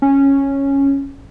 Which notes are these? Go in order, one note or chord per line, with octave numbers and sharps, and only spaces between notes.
C#4